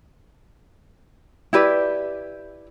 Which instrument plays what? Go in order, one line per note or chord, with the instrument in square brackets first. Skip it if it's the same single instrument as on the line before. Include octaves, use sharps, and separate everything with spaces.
[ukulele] E4 G4 B4 D5